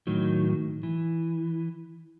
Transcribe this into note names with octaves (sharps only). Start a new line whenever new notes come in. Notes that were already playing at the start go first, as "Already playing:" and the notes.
A2 D#3 F#3
E3